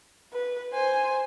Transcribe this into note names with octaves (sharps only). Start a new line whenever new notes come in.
B4
C5 G#5